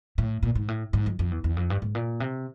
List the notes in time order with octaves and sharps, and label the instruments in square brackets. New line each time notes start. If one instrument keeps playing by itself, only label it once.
[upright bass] A2
A#2
G#2
A2
G#2
F2
F2
E2
E2
F2
G2
G#2
A#2
C3